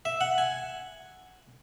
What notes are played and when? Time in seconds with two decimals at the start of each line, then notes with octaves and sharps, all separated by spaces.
0.05 E5
0.21 F#5
0.38 G#5